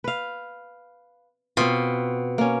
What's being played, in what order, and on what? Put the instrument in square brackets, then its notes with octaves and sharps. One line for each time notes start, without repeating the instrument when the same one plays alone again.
[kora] B4 F5
[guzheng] B2 [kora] C4 F4
[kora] A#3 C#4